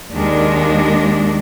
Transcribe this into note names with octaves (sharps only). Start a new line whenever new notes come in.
D#2 D#3 G#3 D4